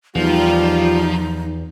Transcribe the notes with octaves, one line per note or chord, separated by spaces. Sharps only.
E2 F3 G3 D#4 F4